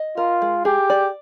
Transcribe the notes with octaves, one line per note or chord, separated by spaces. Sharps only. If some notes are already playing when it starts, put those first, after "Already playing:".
Already playing: D#5
F4 A#4
G#3
G4 G#4
D5